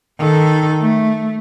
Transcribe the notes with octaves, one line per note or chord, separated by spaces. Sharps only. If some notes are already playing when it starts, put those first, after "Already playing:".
D#3 A4
A3